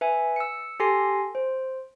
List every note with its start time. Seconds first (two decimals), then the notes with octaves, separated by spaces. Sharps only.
0.01 B4 E5 G#5
0.36 E6 C#7
0.80 G4 A4 G#5 C6 A#6 C7
1.35 C5